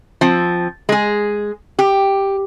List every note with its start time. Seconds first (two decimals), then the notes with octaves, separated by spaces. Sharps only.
0.21 F3 C4
0.89 G#3 G#4
1.79 G4